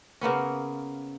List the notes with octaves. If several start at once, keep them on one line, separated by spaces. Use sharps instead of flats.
C#3 A#3 B3 C#4